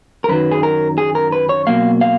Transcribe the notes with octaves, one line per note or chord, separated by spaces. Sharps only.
A#4
F#2 D#3 F#3 B4
G#4
A#4
G#4
A#4
B4
C#5
B2 F#3 A#3 F5
F5